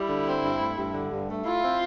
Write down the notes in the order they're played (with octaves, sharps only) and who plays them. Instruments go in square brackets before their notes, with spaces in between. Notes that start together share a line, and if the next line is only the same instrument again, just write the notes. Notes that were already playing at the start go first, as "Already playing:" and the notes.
Already playing: [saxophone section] G3 [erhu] E4
[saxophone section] D3
C4
G2
A3
G2
D3
G2
A3
[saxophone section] E4 [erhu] F4
[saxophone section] C4